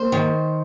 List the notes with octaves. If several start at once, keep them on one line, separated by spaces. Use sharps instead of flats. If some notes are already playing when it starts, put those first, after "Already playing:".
Already playing: A#3 C5
D#3